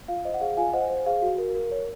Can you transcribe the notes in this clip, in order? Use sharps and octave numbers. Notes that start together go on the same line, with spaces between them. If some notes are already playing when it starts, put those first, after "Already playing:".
F4 F5
C5 D#5
F#5
G#4 F5
F4 F5 G#5
C5 D#5 F#5
C5
G#4 F5
F#4
A#4
A#4
C#5